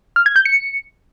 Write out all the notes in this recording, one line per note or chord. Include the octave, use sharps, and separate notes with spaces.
F6
G#6
G6
C#7